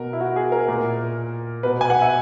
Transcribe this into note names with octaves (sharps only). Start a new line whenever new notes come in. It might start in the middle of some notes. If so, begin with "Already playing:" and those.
Already playing: B2 A#4
E4
F#4
G#4
A#4
A#2
B2 B4
G#5
F#5
E5